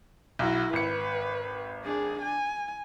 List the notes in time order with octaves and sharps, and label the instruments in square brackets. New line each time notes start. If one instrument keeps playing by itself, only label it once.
[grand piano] B1 [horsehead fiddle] E4 F#4
[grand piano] G#1 C#7 [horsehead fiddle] B4
[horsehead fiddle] D4 G#4
G#5